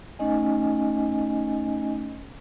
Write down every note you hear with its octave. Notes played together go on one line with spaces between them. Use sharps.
A3 C#4 D#4 D#5 G#5